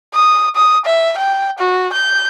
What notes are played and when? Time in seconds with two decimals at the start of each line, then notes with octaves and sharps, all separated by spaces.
0.14 D#6
0.56 D#6
0.86 E5
1.18 G5
1.59 F#4
1.93 G6